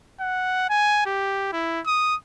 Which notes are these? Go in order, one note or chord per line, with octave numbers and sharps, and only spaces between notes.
F#5
G#5
G4
E4
D#6